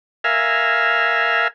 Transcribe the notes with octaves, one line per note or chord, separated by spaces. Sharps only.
A#4 E5 F5 G#5